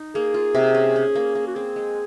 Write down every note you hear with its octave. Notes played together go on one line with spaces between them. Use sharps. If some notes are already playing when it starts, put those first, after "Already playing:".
Already playing: D#4
A#3 G#4
F4
C3
C#4
C#4
A#3
A#3
F#4
C4 G#4
G#3